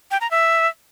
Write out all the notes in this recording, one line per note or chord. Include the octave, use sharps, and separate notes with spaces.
G5
A#5
E5